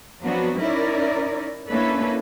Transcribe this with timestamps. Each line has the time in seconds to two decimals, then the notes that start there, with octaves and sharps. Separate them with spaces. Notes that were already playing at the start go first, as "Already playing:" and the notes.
0.21 F3 F#3 B3 C4 D4 F#4
0.60 C#4 D#4 E4 A#4 C#5 D5
1.69 A#3 C#4 D4 E4 A4 B4